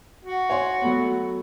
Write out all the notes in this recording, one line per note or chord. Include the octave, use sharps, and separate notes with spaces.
F#4
C#5 G#5 C6
F#3 A3 B3